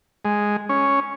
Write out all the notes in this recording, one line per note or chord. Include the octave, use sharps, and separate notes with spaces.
G#3
C#4